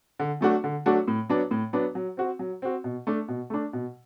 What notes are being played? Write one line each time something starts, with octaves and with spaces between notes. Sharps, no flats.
D3
F#3 A3 D4 F#4
D3
F#3 A3 D4 F#4
A2
F#3 B3 D4
A2
F#3 B3 D4
F#3
C4 F#4
F#3
C4 F#4
B2
A3 D4
B2
A3 D4
B2